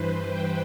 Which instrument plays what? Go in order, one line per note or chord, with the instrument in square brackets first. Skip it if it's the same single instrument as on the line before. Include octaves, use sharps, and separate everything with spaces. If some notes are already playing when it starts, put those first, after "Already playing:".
Already playing: [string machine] G2 E3 B4 C5
G5